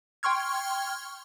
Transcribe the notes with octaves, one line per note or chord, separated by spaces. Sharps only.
G5 C6 C#6 F6 G#6